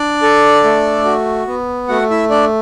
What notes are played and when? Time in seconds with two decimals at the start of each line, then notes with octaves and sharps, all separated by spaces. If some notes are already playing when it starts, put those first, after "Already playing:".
Already playing: D4 D5
0.22 A4
0.64 A3
1.05 F#4
1.47 B3
1.89 A3 F#4 F#5
2.10 E4 E5
2.30 D4 D5